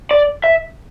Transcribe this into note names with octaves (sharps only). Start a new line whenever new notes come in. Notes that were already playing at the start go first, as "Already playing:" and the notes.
D5
E5